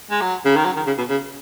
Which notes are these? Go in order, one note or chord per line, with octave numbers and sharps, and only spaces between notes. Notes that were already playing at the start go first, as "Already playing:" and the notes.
G#3
F#3
C#3
D#3
F#3
D#3
C#3
B2
C#3